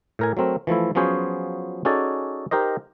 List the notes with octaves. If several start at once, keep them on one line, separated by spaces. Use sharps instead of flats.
A2 A#4 G#5
F#3 A3 C4 A#4
E3 F3 A3 E4
F3 F#3 B3 C#4 G#4 C5
C#4 D#4 F#4 G#4 A4 D5
D#4 G4 A#4 C5 D#5